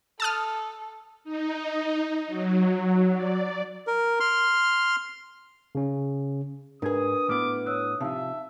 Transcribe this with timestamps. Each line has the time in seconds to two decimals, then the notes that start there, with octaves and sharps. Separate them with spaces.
0.20 A4 A5 D#6 F6
1.24 D#4
2.28 F#3
3.12 D5
3.87 A#4
4.20 C6 F6
5.75 C#3 C#4
6.82 G#2 D4 G#4 A#4 B4 D#6 G#6
7.29 A2 B3 E4 D6 F6
7.66 C#5 D#6 E6 F#6
8.01 C3 F3 D#4 E5 F5 A5